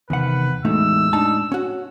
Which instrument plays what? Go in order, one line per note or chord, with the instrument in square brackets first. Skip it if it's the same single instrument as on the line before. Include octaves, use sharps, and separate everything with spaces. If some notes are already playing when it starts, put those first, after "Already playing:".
[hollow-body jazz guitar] E2 F#5 [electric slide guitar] C3 D#3 [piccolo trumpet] B4
[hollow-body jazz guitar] E2 A3 D#4 [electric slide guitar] A2 G#3 F#4 [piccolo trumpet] E6
[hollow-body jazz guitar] D4 D#4 A5
C#4 F#4